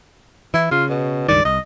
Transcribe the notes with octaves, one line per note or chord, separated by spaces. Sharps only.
E3 E4
C#3 F4
B2
C#2 G2 D#3 D5
C2 D#5